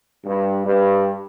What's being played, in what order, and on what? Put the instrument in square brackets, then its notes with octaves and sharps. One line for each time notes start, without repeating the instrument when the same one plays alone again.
[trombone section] G2
G2